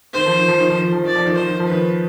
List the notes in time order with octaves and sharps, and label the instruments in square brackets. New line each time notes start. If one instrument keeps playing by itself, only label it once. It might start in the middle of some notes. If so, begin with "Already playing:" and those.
[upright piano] D#3 [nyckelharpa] C5
[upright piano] F3
D#3
F3
D#3
F3
D#3
F3
[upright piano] D#3 [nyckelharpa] D5
[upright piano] F3
D#3
[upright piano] F3 [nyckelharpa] C5
[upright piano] D#3
F3
[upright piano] D#3 [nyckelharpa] B4